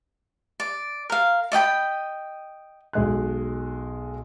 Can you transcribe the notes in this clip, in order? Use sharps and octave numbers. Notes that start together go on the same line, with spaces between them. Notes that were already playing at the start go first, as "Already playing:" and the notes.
D5
A#4 F5
D5 D#5 G5 B5
B1 G#3 F#6